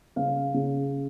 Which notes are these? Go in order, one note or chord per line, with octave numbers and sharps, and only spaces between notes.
C#3 F5
C#3